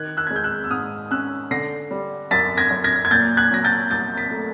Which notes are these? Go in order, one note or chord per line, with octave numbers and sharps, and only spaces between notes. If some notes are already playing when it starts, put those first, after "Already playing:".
Already playing: D#3 F#6 G#6
E6 F#6
G#3 G#6
G6
E6 F#6
E6
G#2 D#6 F6
C#4 E6 F#6
D3 A#6 C7
G3
F#2 A6 B6
G#6 A#6
F#2
G#6 A#6
G#6
A#2 G6 A6
F#6 G#6
F#3 A#6
G6 A6
C2 G6 A6
A6 B6
A3